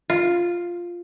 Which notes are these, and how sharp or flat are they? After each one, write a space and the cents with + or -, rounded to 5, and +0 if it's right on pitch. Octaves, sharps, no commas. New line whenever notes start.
F4 +0